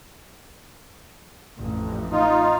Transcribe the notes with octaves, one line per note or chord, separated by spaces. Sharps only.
A1 F2
D#4 F4